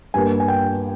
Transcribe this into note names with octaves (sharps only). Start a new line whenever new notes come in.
G2 G3 A#3 G#5
G#5
G5